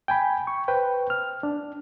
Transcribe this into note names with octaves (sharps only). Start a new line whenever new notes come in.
G5 G#5 B5
C#6
B4 C5 G5
F6
D4